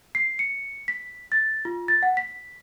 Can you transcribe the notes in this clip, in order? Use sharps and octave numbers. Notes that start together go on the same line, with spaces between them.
C7
C#7
B6
A6
F4
A6
F#5
B6